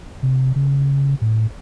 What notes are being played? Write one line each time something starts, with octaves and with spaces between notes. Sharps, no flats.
C3
C#3
A2